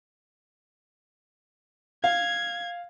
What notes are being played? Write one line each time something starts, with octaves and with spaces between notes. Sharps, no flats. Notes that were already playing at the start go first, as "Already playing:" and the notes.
F5 G#6